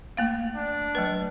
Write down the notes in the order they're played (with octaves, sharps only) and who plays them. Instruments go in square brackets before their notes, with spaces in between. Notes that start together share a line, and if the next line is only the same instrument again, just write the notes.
[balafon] A3 A#3 F5
[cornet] D4
[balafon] F#3 A3 B4